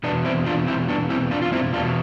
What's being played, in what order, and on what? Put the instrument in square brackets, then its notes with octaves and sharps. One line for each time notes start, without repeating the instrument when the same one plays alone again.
[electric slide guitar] E2 B2 B3 D4
C4 E4
D4 F4
C4 E4
B3 D4
C4 E4
D4 F4
F4
C4 E4
E2 D4 F4
B2